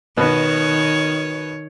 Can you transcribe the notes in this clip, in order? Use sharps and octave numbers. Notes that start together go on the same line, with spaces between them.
B2 D#3 B3 C#5